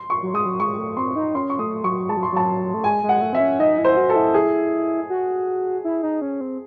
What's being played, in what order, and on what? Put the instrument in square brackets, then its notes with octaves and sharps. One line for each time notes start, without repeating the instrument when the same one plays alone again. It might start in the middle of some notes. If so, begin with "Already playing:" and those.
Already playing: [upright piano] C6
C#6
[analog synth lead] F#3
[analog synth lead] G#3 [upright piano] D#6
[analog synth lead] F#3
[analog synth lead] G#3 [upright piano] C#6
[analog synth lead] A3
[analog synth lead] C4 [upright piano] C6
[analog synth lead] D#4
[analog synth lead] C#4 [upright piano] C6
[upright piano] C#6
[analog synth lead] A3 [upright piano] D#6
[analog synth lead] F#3 [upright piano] C#6
[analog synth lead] G#3 [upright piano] A5
[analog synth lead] F#3
[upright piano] C6
[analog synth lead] F#3 [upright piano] A5
[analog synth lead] A3
[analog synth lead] G#3 [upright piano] G#5
[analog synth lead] G#3
[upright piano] F#5
[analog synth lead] A3
[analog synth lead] C4 [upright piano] E5
[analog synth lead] C#4
[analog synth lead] D#4 [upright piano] D#5
[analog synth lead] E4
[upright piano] C5
[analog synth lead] F#4
[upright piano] A4
[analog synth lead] E4
[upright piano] G#4
[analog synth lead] F#4
E4
D#4
C#4
C4